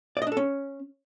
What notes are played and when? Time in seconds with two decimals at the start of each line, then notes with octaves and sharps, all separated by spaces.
0.17 D5
0.22 D#5
0.27 D4
0.32 A4
0.37 C#4